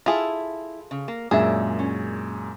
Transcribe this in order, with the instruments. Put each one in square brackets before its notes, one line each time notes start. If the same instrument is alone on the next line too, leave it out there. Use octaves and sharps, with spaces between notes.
[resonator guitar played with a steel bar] E4 [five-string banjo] F4 G#4 A4
[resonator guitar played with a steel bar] C#3
A#3
[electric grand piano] F#2 A#2 G#3 [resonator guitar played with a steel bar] D4 E5 [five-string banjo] G#4
[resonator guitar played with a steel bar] C#4